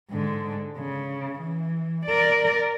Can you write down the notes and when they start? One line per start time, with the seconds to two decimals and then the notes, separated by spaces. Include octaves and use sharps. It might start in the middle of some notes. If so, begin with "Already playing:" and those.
0.10 G#2 D3
0.79 C#3
1.40 E3
2.06 A#4 D5